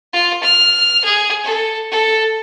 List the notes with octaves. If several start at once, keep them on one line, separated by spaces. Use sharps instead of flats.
F4
F6
G#4
A4
A4